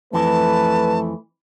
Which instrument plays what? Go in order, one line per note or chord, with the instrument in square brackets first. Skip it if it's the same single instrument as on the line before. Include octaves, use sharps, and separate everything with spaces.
[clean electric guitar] F2 E3 [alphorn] A3 [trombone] B4 [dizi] A5